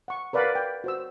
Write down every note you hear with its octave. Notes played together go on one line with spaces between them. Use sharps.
F#5 C#6
A#4 B4 D5 F5 F#5 B5
G5
F#4 C5 E6